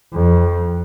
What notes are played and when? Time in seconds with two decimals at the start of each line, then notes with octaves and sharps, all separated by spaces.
0.13 F2